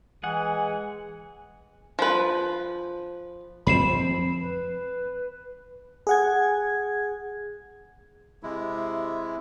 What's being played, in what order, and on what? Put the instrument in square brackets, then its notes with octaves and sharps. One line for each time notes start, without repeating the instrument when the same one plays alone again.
[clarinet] E3 [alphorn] G#3 [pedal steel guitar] G#4 F#5 [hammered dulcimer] G#5
[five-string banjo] F3 B4
[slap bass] F2 F3 C4 [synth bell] B5 C7 E7
[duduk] B4
[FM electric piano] G#4 F#5 G#6
[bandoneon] C3 G#3 E4